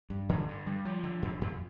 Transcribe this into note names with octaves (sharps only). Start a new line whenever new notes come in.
G2
D3
G2
G3
F3
D3
F2
F2